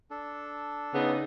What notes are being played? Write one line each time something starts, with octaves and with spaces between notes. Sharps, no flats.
D4 A4
C#3 B3 D#4